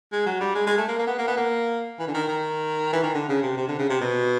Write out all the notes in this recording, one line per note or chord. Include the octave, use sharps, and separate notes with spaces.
G#3
F#3
G3
G#3
G#3
A3
A#3
A#3
B3
A#3
B3
A#3
E3
D3
D#3
D#3
E3
D#3
D3
C#3
C3
C3
D3
C#3
C3
B2